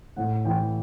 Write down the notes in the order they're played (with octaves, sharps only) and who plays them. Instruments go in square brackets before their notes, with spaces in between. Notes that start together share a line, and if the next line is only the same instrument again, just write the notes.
[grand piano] A2 F#5
E3 G5